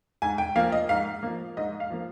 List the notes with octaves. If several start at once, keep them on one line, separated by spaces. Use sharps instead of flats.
G#2 G#5
G5
F3 A#3 F5
D#5
G#2 F5
F3 A#3
G#2 D#5
F5
F3 A#3